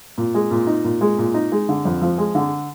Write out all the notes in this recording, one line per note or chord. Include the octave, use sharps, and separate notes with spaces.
A#2
G#3
A#2
D#4
A#2
G#3
A#2
D#4
G#3
D3
F2
F3
G#3
D3